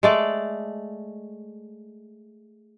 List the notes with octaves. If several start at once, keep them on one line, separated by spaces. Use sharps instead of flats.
G#3 A3 D5